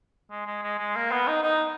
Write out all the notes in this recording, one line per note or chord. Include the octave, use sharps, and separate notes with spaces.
G#3
G#3
G#3
G#3
A#3
B3
D#4
D#4